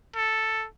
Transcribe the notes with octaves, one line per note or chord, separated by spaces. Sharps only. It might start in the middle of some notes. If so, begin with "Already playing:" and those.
A4